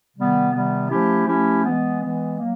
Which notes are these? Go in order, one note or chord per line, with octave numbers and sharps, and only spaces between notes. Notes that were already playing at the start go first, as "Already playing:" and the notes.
C3 D#3 G3 B3
C3 D#3 G3 B3
F3 A3 C#4 E4 G4
F3 A3 C#4 E4 G4
E3 G#3 B3
E3 G#3 B3
F#3 A#3